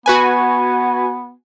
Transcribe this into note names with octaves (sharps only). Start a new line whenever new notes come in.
B3 F#4 B4 G#5